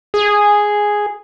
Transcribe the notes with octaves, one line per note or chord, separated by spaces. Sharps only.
G#4